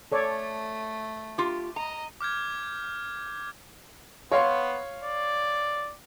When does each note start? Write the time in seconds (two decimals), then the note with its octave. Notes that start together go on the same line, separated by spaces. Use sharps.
0.12 A3 A4 C#5 D5
1.38 F4 G4
1.76 D#5 A#5
2.21 D6 F6 G6 G#6
4.32 B3 C#5 F5 C6
5.04 D5